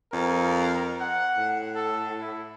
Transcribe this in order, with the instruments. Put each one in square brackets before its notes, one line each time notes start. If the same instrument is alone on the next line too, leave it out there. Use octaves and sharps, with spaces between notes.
[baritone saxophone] F2 [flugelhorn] A#4
[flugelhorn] F#5
[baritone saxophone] A2
[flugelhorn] A4
E4